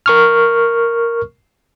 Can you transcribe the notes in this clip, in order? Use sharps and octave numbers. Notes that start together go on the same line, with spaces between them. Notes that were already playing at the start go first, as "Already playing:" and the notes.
A#4 C#6 F6